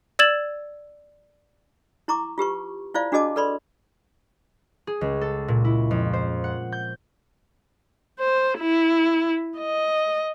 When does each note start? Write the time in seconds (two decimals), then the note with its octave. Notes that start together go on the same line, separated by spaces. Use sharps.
0.19 D5 E6 G#6 A6 E7 F#7
2.08 E4 A#5 C#6 D6
2.38 F4 G4 B4 C#6
2.94 E4 F4 C5 D5 F5
3.12 D4 F#4 G#4 D#5 A5 D6
3.36 A4 B4 D5 B5 C6
4.87 G#4
5.01 C#2
5.21 A4
5.48 A#2
5.65 E4
5.91 F2
6.13 C5
6.44 F#5
6.72 G6
8.19 C5
8.59 E4
9.58 D#5